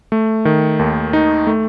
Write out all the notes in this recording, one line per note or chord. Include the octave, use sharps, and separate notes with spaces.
A3
D#3
D#2
D#4
A3